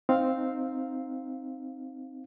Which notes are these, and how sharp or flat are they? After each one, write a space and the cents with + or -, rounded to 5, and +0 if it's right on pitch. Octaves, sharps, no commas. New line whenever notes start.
C4 +0 D#4 +0 F5 +0